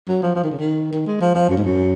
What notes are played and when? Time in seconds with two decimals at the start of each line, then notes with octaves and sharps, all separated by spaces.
0.08 F#3
0.22 F3
0.35 F3
0.43 D#3
0.51 C#3
0.58 D#3
0.93 D#3
1.07 G#3
1.21 F3
1.35 F3
1.49 F#2
1.57 G#2
1.64 F#2